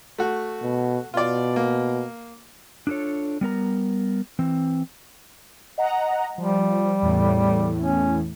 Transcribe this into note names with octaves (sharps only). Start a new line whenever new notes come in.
A3 F#4
B2
B2 F4 D5
A#3
D4 F4 G#4 A4 C#5
G3 B3 A#4 A#5
E3 C4
D#5 F#5 A#5
F3 G3
E2 A2
C#4